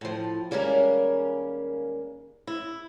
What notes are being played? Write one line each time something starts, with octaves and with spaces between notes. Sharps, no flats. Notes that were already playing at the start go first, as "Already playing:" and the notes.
A2 F3
D#2 G3 G#3 A#3 C#4 A#4
E4